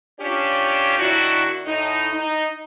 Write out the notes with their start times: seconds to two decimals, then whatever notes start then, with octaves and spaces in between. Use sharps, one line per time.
0.20 C#4 D4 F4 G4 C#5
0.99 D#3 D4 E4 F#4
1.66 A2 D#4
2.13 D#4